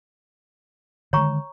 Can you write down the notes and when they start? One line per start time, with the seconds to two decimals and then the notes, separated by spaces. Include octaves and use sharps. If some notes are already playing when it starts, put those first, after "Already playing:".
1.13 D3 D#3 G#3 C#5 A#5 C#6